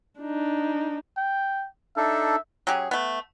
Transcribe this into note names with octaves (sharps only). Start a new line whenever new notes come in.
D4 D#4
G5
D4 D#4 A4 E5
F#3 C#4 G4 G#4
A3 B3